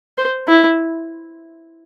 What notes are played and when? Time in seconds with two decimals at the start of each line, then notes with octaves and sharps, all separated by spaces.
0.18 C5
0.48 E4